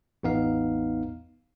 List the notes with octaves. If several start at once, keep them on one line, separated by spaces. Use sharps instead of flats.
A1 E2 B3 D#4 F5